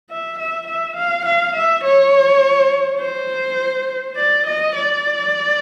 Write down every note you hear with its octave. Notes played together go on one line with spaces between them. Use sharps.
E5
E5
E5
F5
F5
E5
C#5
C5
D5
D#5
D5